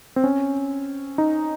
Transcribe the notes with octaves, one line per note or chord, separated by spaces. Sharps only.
C4
C#4
D#4